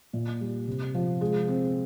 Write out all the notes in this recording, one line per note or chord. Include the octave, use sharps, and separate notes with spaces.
A#2
G3
C3
F3
G#3
C4